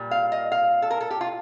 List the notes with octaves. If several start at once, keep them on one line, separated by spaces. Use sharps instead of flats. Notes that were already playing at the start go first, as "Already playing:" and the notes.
Already playing: A#2 G3 A#3
F5
D#5
F5
A4
A#4
A4
G4
F4